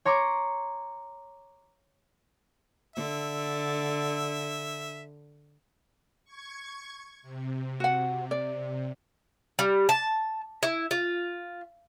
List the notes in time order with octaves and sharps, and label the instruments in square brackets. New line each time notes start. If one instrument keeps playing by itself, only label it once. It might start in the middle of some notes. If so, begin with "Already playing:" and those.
[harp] C#5 A#5 C6 D6
[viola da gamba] D3 [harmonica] E5
[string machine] C#6 G#6
C3
[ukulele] F#4 F#5
D5
[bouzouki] G3
A5
E4
F4